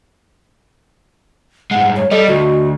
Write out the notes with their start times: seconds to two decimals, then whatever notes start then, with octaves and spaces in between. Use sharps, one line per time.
1.71 G2 G#3 F#5
1.97 C#5
2.11 G3 A4 D#5
2.28 D2 F#4